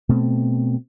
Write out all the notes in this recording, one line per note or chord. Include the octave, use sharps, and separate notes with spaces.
B2 A3 C4